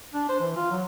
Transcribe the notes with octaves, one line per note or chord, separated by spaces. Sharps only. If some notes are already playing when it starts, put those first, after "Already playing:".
D4
C5
E3
F4
F#3